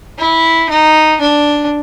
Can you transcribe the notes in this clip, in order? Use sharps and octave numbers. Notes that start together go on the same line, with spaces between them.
E4
D#4
D4